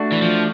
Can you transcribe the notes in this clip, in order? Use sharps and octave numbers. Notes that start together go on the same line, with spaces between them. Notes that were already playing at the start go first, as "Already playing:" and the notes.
Already playing: A3 D4 F#4
E3
F3